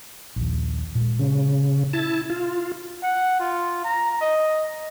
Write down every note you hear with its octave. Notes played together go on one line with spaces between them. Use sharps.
A#1 D#2
A#2 G#3
C#3
E4 A5
F4
F#5
F4
A#5
D#5